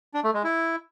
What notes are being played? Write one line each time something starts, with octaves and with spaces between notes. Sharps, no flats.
D4
A3
G#3
E4